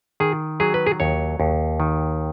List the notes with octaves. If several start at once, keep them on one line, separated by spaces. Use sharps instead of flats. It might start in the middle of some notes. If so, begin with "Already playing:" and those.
D#3 G#4
F#3 G#4
B4
G#4
D#2 C#5
D#2
D#3